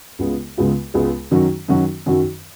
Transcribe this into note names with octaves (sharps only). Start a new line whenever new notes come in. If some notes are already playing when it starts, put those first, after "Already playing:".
C#2 C#3 G#3 B3 F4
C#2 C#3 G#3 B3 F4
C#2 C#3 G#3 B3 F4
F#2 D#3 F#3 C#4 F#4
F#2 D#3 F#3 C#4 F#4
F#2 D#3 F#3 C#4 F#4